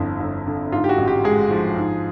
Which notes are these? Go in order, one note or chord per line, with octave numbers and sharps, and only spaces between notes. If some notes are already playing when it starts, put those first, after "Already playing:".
Already playing: G1 F2 E4
G1
D3
G#2 F4
G4
F#4
A1
G4
G#3 G#4
F3
G#2